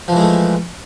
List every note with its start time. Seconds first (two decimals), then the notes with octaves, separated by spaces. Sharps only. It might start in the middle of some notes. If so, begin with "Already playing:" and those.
0.08 F3
0.12 E3
0.16 G#3
0.20 A3